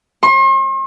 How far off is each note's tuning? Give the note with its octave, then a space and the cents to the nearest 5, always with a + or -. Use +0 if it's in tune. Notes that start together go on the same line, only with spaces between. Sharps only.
C6 +45